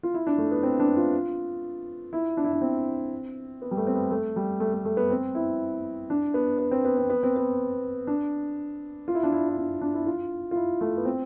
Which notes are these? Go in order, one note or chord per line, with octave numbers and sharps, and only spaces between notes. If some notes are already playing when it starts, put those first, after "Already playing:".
F4
E4
D4
A3
B3
C4
D4
F4
E4
D4
E4
D4
C4
B3
G3
A3
C4
B3
A3
G3
A3
A3
A3
B3
C4
E4
D4
B3
B3
C4
B3
C4
B3
C4
B3
D4
F4
E4
D4
E4
E4
D4
D4
E4
F4
F4
E4
A3
B3
C4